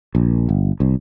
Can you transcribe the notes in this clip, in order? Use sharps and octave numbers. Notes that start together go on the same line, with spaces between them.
A#1
G1
C2